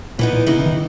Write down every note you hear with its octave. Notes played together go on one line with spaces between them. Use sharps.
A#2 E3 B3 D#4
A#2
C#3 E3 B3 D#4
C#3
D#3